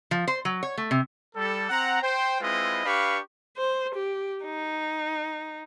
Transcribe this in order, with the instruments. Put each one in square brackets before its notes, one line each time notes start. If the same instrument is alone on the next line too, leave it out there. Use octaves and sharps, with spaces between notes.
[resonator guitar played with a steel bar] F3
C5
F#3
C#5
A3
C3
[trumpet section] G3 A4
C4 F#5 A#5
C5 G5
G#3 C4 E4 F4 B4 D#5
D4 G4 B4 F5 B5 C#6
[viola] C5
G4
D#4